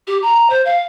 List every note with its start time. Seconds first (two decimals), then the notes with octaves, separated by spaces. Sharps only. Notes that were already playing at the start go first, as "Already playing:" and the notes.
0.07 G4
0.22 A#5
0.50 C5
0.65 F5